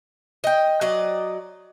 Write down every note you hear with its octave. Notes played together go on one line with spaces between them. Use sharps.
D#5 G5
F#3 D5 D#5